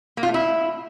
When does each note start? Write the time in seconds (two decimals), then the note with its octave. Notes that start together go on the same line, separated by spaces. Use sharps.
0.17 A#3
0.23 F4
0.29 A3
0.34 E4